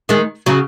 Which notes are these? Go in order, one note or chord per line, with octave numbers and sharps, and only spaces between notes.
D#3 G#3
C#3 F#3